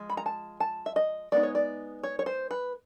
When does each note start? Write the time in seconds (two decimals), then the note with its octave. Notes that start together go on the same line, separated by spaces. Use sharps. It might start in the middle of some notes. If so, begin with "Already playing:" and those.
Already playing: F3 G#3
0.10 B5
0.17 A#5
0.26 A5
0.60 A5
0.86 E5
0.96 D#5
1.32 G#3 B3 D#4 D5
1.43 C#5
1.55 D5
2.03 C#5
2.19 C#5
2.26 C5
2.51 B4